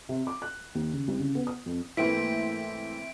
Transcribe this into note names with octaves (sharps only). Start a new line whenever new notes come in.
C3
D6
F#6
D#2
C#3
C2
C#3
B3
D#6
F2
G#2 E3 A3 A#3 C4 E4 B6 D7